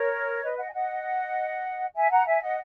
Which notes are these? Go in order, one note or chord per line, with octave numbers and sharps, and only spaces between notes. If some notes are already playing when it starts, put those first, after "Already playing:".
Already playing: A#4 C#5
B4 D#5
D#5 F#5
G#5
D#5 F#5
E5 G#5
F#5 A#5
E5 G#5
D#5 F#5